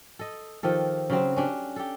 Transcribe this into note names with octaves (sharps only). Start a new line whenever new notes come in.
A4 D#5
D#3 F3 G4 A4
C#3 F#3 C4
C#4 D4 G4
G4 A4